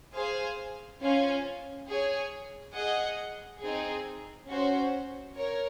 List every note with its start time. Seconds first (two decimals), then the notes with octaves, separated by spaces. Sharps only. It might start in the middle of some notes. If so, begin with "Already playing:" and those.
0.14 G#4 C5 F5 G#5
1.01 C#4 F4 C5 F5 G#5
1.88 G#4 C#5 G#5
2.75 G#4 D#5 F#5
3.62 C4 D#4 G#4
4.49 C#4 F#4 C5
5.36 A#4 C#5